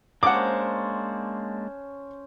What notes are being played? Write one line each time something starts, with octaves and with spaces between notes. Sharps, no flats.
G#3 A#3 C#4 D4 C5 F#5 A5 D6